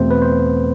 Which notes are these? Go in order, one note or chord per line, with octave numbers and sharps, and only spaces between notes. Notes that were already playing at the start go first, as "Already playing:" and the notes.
Already playing: E2 B2 A3 C4 C5
B4
C5